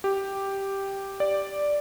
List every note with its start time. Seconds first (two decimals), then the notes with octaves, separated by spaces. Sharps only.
0.04 G4
1.20 D5